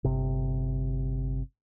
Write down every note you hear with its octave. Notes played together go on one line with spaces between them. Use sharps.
G1 C3